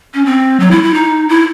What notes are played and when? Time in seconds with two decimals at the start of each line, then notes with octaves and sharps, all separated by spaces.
0.14 C#4
0.26 C4
0.60 F#3
0.71 E4
0.83 E4
0.94 D#4
1.29 E4